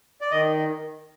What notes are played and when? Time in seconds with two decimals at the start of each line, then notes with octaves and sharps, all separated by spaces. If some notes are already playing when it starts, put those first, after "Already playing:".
0.21 D5
0.31 D#3 D#5